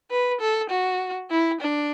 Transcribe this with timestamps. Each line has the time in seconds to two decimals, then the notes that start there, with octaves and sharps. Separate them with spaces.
0.10 B4
0.40 A4
0.70 F#4
1.30 E4
1.61 D4